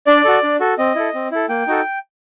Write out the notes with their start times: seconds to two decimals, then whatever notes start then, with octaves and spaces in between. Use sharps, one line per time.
0.07 D4 D5
0.24 F#4 A4
0.43 D4
0.60 F#4 A4
0.78 C4 D#5
0.95 E4 A4
1.14 C4
1.32 E4 A4
1.49 A#3 G5
1.67 D#4 F#4 A4